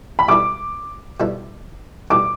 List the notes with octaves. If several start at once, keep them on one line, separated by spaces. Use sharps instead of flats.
B5
B2 G3 E4 A4 D6
B2 G3 E4 A4
B2 G3 E4 A4 D6